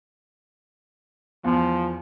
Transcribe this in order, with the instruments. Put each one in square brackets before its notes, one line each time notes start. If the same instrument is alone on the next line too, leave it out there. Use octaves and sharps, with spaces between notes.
[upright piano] E2 [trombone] F3